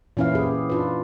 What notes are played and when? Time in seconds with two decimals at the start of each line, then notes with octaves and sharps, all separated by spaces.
0.17 A#2 E3 C#4 E4 B4 F5
0.35 G4 G#4
0.70 D4 F4 B4